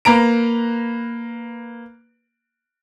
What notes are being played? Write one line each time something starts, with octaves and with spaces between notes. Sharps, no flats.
A#3 B4 A#5 D7